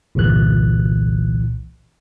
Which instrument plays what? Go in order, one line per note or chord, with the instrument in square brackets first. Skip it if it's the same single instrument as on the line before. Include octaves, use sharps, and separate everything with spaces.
[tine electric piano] G1 C2 A#2 E3 F#6